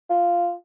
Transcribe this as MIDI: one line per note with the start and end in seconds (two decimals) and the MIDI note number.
0.10 0.53 65